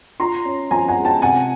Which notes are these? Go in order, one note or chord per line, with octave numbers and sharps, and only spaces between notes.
F4 A#5 C6
C#4
F3 G#5 A#5
F#5 G#5
G#3
G5 A5
C3 F#5 G#5